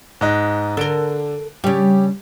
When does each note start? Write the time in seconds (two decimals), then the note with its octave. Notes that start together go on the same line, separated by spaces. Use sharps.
0.21 G#2 D#5 F#6
0.77 D3 A4 A#4 D7 G7
1.64 C#3 G3 G4 C#5